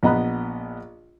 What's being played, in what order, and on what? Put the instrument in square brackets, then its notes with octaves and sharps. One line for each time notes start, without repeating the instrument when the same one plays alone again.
[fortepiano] A#1 B3 D#5 A#5 B5 F#6